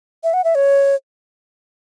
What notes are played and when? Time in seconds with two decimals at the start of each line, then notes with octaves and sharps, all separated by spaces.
0.24 E5
0.34 F#5
0.44 E5
0.55 C#5